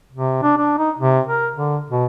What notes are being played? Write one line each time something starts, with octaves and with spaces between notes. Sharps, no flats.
C3
D4
D4
D#4
C3
A#4
D3
B2